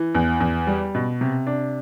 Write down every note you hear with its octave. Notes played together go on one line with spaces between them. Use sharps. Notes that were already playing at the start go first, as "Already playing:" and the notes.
Already playing: E3
E2
E2
G3
B2
C3
D4